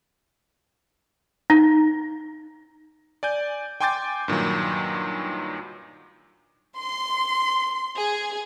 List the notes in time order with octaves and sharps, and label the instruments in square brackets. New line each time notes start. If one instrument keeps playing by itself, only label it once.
[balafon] D#4
[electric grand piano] D5 G#5 G6
G5 G#5 C6 D6 G6 A6
G2 A#2 D#3 F#3
[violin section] C6
G#4